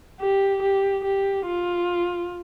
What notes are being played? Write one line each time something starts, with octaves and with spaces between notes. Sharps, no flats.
G4
G4
G4
F4